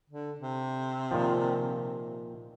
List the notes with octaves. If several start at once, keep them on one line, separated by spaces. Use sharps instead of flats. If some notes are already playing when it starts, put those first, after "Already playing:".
D3
C3
A#2 D#3 F3